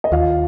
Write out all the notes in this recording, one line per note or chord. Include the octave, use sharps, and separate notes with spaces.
D#5
D#2 F4 F5